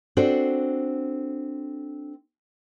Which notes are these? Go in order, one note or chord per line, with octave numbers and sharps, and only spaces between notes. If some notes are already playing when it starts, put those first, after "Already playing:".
C4 D4 F#4 A4 C5